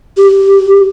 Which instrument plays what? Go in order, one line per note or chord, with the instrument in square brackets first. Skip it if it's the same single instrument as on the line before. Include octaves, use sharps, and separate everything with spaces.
[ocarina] G4